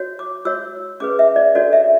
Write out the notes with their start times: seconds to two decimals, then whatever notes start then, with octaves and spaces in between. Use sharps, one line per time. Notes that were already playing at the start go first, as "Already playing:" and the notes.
Already playing: F#4 C#5
0.19 D6
0.45 F#4 C#5 E6
1.00 C#4 G#4 B4 D6
1.19 E5
1.36 D5
1.55 D4 F#4 A4 C#5 D5
1.73 E5